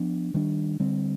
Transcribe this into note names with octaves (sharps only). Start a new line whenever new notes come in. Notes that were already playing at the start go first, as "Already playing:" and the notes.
Already playing: F3 B3 D4
D#3 G3 D4
D3 G3 C4